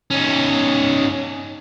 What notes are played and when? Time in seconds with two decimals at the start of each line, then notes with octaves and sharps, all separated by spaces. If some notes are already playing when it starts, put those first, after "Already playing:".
0.11 C#4 D#4